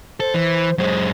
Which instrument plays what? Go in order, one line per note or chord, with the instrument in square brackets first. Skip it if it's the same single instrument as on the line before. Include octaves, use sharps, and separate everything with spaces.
[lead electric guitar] A4 [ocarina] C5
[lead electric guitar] E3
[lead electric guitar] F#2 G#3 [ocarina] C5